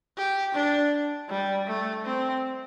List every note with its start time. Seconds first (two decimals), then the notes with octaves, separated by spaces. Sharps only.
0.17 G4
0.54 D4
1.29 G3
1.67 A3
2.04 C4